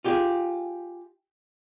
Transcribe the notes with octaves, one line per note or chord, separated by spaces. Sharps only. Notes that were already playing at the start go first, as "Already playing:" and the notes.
F4 G4 G#4